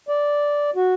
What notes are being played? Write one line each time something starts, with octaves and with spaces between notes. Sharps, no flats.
D5
F#4